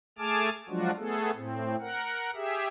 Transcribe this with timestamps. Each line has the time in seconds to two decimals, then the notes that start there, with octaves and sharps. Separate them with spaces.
0.18 A3 G#4 G#5 A5 D6 F6
0.69 F3 F#3 G#3 D4 F4 F#4
0.98 A3 B3 G#4 A4
1.34 A2 C4
1.80 A#4 F#5
2.35 G4 G#4 E5